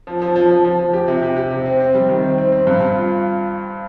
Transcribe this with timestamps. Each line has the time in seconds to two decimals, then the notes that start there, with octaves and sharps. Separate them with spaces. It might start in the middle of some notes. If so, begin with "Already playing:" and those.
0.07 F3
0.22 F3
0.36 F3
0.51 F3
0.64 F3
0.79 F3
0.93 G4
1.08 C3
1.23 G4
1.36 G4
1.51 C3
1.66 C4
1.80 C4
1.95 G3
2.09 D#3
2.23 C4
2.38 C4
2.52 C4
2.67 G2
2.81 G2
2.96 F4